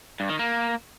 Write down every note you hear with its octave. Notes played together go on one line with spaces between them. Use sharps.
G2
D#3
A#3